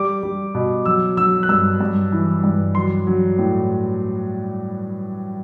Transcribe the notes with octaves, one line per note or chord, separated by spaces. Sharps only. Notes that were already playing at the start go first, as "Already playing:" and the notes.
Already playing: G3 D6
G3
B2
F#3 E6
F#3 E6
F#6
G2 E6
G2
E3
G2
F#3 C6
F#3
A2